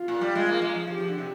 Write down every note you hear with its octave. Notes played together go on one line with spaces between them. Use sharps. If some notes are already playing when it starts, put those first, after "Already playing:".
Already playing: F4
A#2
G3
G#3
A#3
G#3
F3
F3 G4
F3
D3
C3